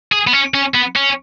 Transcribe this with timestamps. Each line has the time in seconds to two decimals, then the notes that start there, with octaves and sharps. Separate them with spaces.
0.12 G#4
0.27 B3
0.33 C#4
0.54 C#4
0.75 B3
0.96 C#4